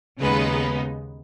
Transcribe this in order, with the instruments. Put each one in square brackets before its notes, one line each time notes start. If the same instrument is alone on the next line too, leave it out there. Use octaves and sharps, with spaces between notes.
[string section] D#2 C#3 G#3 B3 D#4 B4